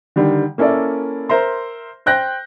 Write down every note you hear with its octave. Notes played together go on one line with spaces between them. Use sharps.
D3 D#3 G3
A#3 C#4 E4 A4 D5
A#4 C5 E5 A#5 C6
C5 G5 F#6 G6 A#6